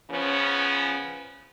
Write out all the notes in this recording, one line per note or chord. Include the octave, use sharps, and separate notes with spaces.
C#3 F3 B3 C#4